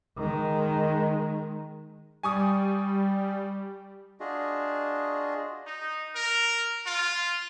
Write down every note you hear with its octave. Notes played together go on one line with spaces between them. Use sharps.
D#3 G#3
G3 G#5 C#6 D#6
D4 F4 F#4 G#4 D#5
D#4
A#4
F4